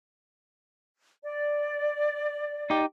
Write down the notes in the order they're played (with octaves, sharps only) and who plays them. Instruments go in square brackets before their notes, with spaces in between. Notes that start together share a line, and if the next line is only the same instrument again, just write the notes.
[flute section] D5
[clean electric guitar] D#4 G4